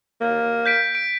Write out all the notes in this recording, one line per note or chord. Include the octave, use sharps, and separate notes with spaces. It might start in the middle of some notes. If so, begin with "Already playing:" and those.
A#3
G6 B6 D7
D7